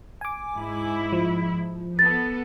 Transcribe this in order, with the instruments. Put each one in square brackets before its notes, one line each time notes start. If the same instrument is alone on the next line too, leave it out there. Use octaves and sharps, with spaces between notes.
[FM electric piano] G#5 D6
[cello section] G#2 E4
[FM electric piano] F3
[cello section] B3 A4 [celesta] A6